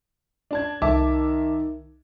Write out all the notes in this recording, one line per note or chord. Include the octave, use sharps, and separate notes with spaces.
D4 A5 G#6
C2 D#3 E5 A5 D6